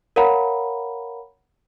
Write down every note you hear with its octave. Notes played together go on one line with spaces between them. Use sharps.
A#4 C#5 F5 F#5 A#5 B5